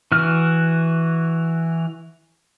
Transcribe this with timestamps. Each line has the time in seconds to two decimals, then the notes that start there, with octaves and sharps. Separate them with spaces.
0.12 E3 F#4 F6